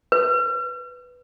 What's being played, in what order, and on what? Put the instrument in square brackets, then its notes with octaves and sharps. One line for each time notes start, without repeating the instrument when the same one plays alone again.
[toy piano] B4